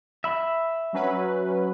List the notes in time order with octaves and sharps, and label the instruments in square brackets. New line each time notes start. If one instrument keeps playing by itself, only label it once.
[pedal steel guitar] E5 B5
[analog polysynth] F#3 C#4 B4